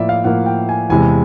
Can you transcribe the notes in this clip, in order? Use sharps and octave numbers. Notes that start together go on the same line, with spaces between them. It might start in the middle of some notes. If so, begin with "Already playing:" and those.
Already playing: A2 F3 A#3 D5 E5
F5
A2 F3 A#3 F#5
G5
G#5
E2 C3 E3 G#3 G#5